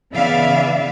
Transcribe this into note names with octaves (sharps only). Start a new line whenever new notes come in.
C#3 E3 B3 D5 E5 F5